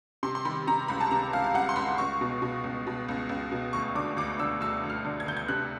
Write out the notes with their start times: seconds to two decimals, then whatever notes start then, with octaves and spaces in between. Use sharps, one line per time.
0.23 C3 C6
0.35 C6
0.45 D#3 B5
0.67 C3 A#5
0.88 C#2 B5
1.01 A5
1.11 C3 A#5
1.33 C#2 F5
1.44 F5
1.54 C#2 F#5
1.69 C6
1.76 C#2 B5
1.98 C#2 C#6
2.21 B2
2.42 B2
2.64 C#2
2.87 B2
3.08 C#2
3.29 C#2
3.52 B2
3.73 D2 C#6
3.95 D3 D6
4.17 D2 D6
4.39 D3 E6
4.61 D2 E6
4.83 D2
4.90 F6
5.05 D3
5.20 G#6
5.26 D2 G6
5.37 G#6
5.48 C3 F#6